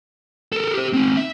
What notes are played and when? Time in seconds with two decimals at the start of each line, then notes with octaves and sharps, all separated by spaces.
0.52 A4 A#4
0.74 G4 C5
0.93 C4 D#4
1.17 E5